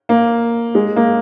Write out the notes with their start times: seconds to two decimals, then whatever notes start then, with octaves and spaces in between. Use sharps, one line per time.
0.09 A#3
0.75 G#3
0.96 A#3